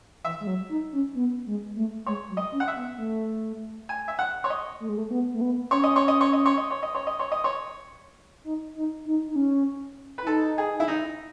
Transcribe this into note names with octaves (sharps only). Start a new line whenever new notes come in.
E3 E5
G#3
F#3
D#4
C#4
B3
G#3
A3
G#3 C#5
F#3
D#5
C#4
F#5
E5
B3
A3
G#5
E5
F#5
C#5
D#5
A3
G#3
A3
B3
A3
B3
C#4 C#5
D#5
C#5
D#5
C#5
D#5
C#5
D#5
C#5
D#5
C#5
D#5
C#5
D#5
C#5
D#4
D#4
D#4
D#4
C#4
B4
E4
D#4 A4
G#4
E4
D#4